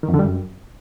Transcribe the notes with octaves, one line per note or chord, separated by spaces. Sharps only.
D#3
F2
D3
G3
F#2